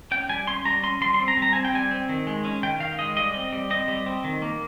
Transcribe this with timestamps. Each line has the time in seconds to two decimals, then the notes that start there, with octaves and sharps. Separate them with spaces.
0.11 C#4 G5
0.29 G3 G#5
0.47 C#4 C6
0.65 G3 A#5
0.83 C#4 C6
1.01 G3 C6
1.14 C6
1.20 C4
1.28 A#5
1.37 G3
1.42 A#5
1.53 C4 G#5
1.65 G5
1.73 G3 G#5
1.91 C4
2.09 D#3
2.27 G#3
2.45 C#4
2.63 D#3 G5
2.80 D#3 F5
2.99 G#3 D#5
3.17 G3 D#5
3.34 C4
3.53 G3
3.70 C4 D#5
3.88 G3
4.06 C4
4.24 D#3
4.42 A#3